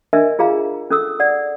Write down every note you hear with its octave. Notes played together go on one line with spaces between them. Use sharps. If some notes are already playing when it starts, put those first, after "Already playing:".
D4 A#4 D#5 E5 G#5
F4 G#4 F5 A#5
C#4 A4 D#6 E6
D5 F#5